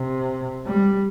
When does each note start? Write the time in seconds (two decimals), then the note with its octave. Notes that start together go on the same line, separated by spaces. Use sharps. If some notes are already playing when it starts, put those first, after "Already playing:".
Already playing: C3
0.66 G3